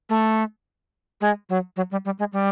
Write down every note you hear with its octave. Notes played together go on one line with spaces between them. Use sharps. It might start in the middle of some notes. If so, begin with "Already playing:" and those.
A3
G#3
F#3
F#3
G3
G3
G#3
G3